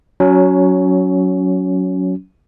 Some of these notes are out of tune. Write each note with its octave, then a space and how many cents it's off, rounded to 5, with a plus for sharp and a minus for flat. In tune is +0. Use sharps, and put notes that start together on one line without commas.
F#3 +0 C#4 +20